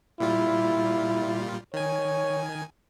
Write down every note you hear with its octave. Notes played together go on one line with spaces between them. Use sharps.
A#2 G3 E4 F4
D#3 C#5 G#5